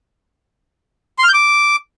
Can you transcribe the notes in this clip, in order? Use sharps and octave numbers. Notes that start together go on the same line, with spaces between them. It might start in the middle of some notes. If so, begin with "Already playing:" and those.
C6
F6
G6
D6